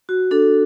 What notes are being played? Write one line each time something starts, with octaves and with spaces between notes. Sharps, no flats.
F#4
D4 A4